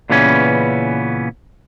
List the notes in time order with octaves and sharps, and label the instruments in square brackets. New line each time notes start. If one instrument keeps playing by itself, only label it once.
[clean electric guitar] A#2 C#3 E3 B3 C#4